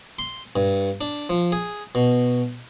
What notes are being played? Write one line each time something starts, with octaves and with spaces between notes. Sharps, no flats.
C6
G2
D4
F3
G#4
B2